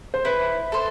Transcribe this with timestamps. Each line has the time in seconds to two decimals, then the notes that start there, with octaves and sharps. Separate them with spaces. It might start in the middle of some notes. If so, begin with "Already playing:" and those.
0.14 C5
0.25 E4 B4
0.72 A4 C5